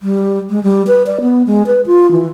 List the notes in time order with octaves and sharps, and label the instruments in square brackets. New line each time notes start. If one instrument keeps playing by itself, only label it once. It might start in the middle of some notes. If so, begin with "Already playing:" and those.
[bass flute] G3
G#3
G3
B4
D5
B3
G#3
B4
F4
E3